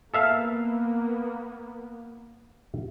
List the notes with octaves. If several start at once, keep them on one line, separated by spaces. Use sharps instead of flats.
A#3 B3 A4 E5 F5